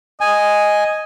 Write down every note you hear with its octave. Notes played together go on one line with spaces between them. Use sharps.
D#5 G#5